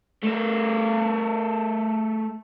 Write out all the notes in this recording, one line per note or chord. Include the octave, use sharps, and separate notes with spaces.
A3 A#4